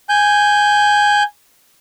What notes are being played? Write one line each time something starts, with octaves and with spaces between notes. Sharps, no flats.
G#5 G6